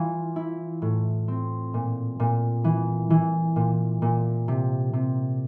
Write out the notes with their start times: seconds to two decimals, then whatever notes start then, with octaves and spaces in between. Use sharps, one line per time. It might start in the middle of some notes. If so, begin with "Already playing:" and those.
Already playing: E3 F4
0.36 E4
0.82 A2
1.28 C4
1.74 A#2
2.20 A#2
2.64 E3
3.10 E3
3.56 A#2
4.02 A#2
4.48 C3
4.93 C3